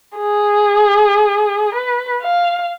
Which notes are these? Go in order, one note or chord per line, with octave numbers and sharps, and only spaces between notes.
G#4
B4
F5